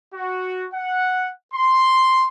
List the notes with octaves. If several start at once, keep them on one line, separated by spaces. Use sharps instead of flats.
F#4
F#5
C6